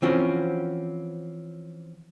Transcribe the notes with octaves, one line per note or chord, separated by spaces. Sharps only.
E3 F3 C4 C#4 F#4